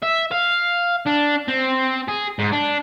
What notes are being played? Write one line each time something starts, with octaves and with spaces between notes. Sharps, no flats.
E5
F5
D4
C4
G#4
G#2
D4